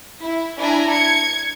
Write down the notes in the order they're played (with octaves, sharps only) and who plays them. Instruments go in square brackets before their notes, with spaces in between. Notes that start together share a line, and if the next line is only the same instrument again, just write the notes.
[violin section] E4
D4 E4 G#5 A#5
G#6 C#7